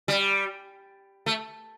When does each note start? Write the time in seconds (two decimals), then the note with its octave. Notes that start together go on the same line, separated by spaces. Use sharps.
0.08 G3
1.26 A3